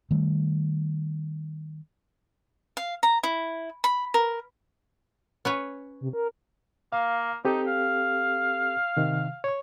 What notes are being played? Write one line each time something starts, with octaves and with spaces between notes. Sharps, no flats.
D#3 G3 A3
F5
A#5
E4
B5
A#4
C#4 B4 C#5
C3
A#4
A#3 F5
C4 D#4 G4 A4
F5
C3 D#3
C#5 C#6